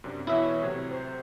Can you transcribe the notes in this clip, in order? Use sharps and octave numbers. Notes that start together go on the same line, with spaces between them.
F#2 C3 D4
B2 E3 E4 C#5 E5
A2 C3 F#3
C5